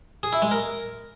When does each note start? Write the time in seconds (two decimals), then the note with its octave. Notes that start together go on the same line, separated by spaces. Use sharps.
0.23 G#4
0.33 E4
0.42 G#3
0.51 A#4